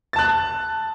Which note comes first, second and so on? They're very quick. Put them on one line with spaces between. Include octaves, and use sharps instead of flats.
A6 A5 F#6